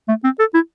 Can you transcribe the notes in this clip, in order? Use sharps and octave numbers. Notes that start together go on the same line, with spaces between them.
A3
C4
A4
E4